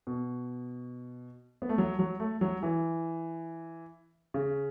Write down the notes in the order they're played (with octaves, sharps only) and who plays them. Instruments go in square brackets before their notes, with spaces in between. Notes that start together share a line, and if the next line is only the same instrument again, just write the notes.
[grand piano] B2
B3
A3
F#3
F#3
A3
F#3
E3
C#3